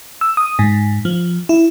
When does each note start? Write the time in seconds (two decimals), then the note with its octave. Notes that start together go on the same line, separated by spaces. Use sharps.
0.21 E6
0.37 D#6
0.59 G#2
1.05 F3
1.49 E4